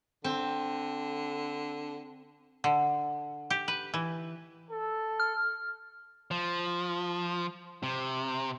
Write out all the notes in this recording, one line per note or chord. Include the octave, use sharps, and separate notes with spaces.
D3 C4
D3
G4
B4
E3
A4
F6
F3
C3